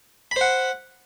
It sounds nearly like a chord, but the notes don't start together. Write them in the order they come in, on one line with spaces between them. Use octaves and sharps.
B5 C5 F#5